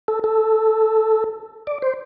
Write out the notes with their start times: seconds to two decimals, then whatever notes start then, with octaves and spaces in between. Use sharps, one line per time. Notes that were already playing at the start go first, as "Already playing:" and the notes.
0.08 A4
0.24 A4
1.67 D5
1.82 C5